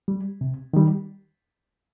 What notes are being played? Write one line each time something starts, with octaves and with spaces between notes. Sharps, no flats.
G3
C3
D#3 G3